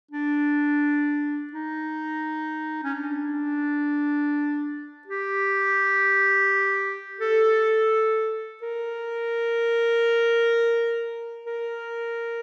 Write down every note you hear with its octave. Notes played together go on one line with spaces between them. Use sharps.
D4
D#4
C#4
D4
G4
A4
A#4
A#4